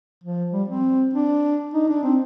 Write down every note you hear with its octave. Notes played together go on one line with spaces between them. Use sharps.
F3
G3
C4
D4
D#4
D4
C4